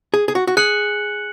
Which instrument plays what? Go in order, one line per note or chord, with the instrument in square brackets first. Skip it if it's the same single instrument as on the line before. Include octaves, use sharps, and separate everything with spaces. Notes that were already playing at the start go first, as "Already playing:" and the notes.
[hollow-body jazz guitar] G#4
G#4
F#4
F#4
[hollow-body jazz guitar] G#4 [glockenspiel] F#6 C#7 F#7